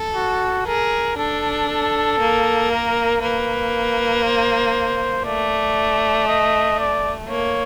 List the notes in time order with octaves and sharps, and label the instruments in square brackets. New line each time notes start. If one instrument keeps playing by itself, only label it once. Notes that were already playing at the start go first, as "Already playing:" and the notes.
Already playing: [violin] A4
[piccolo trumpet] F#4
[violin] G#4 [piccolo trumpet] A#4
[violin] D4 [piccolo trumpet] A4
[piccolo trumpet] A4
[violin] A#3
[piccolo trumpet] A#4
[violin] A#3 [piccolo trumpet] B4
[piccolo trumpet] C5
[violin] A3 [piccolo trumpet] D5
[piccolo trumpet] D#5
D5
[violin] A#3 [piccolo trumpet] C#5